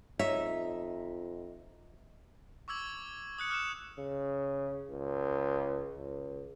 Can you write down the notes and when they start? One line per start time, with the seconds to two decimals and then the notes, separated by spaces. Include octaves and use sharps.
0.19 F2 D#4 C#5 E5
2.68 C#6 D6 E6 G#6 F#7
3.38 D#6 F#6 C#7
3.50 D6 F6 F#6 C#7 E7
3.98 C#3
4.90 C#2
5.96 C#2